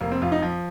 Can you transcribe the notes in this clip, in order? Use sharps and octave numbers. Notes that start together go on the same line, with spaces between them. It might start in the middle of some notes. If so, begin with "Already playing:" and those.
F1 A#3
C4
F2 F4
D#4
F3